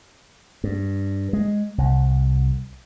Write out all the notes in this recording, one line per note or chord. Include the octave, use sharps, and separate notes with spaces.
G2
G#3
C2